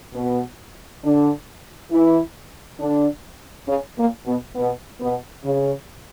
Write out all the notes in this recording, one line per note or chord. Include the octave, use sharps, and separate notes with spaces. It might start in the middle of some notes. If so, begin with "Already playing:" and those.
B2 B3
D3 D4
E3 E4
D3 D4
C#3 C#4
A#2 A#3
B2 B3
B2 B3
B2 B3
C#3